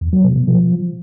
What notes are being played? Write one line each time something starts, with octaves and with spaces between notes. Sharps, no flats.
E2
F#3
B2
B2
F3